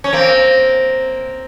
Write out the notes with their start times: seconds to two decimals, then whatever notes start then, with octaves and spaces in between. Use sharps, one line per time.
0.04 C#4
0.13 A#3 C4